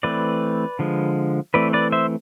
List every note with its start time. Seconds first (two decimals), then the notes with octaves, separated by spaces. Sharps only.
0.03 E3 A3 C4 B4 D5
0.79 D3 F3 G#3
1.54 E3 A3 C4 B4 D5
1.73 B4 D5
1.92 C5 E5